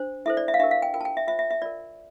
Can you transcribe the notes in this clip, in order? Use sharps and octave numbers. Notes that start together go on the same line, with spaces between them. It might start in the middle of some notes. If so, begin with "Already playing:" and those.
Already playing: D4 C5
E4 A4 C5 E5
D5
E5
F5
D4 G4 A#4 E5
F5
G5
F4 A#4 G5
A5
G5
E5
F4 C5 E5
E5
E5
F4 A#4 D5